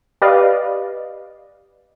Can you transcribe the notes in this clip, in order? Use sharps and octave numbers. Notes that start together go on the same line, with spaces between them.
G4 B4 D5 D#5 F5